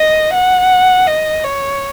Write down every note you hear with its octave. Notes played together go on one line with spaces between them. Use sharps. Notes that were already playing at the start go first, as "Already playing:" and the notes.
Already playing: D#5
F#5
D#5
C#5